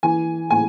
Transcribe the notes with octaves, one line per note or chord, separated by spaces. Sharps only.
E3 G#5
A2 G#5